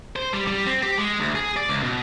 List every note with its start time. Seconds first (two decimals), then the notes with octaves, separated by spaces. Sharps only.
0.16 C5
0.34 G3
0.47 G3
0.66 C4
0.83 G4
0.98 G#3
1.20 D2
1.35 G#4
1.57 D5
1.69 C#2
1.83 B2